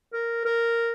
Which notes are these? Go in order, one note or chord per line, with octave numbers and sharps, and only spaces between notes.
A#4
A#4